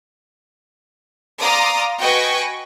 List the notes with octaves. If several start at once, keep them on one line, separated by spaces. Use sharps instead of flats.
D5 F5 A#5 C6 D6 D#6
F#4 B4 D#5 G5 G#5 C#6